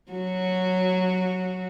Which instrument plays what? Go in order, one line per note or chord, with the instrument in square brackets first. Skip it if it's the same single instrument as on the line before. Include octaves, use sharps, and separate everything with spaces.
[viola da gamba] F#3 F#4